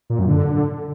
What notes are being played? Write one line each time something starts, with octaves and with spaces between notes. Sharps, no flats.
A#2
F#2
D3